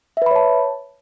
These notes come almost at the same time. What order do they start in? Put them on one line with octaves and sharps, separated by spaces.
E5 B4 B5 C#5 A5